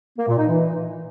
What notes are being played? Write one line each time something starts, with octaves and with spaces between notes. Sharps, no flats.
A#3
A#2
D#4
E3